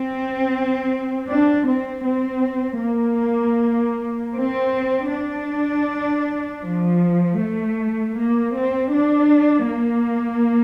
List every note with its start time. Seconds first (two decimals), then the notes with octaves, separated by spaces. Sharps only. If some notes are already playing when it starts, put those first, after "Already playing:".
Already playing: C4
1.29 D4
1.67 C4
2.06 C4
2.82 A#3
4.35 C4
5.12 D4
6.65 F3
7.41 A3
8.18 A#3
8.56 C4
8.94 D4
9.70 A#3